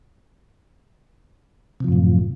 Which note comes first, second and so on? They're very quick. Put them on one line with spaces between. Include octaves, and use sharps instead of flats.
C3 F3 F#2 A2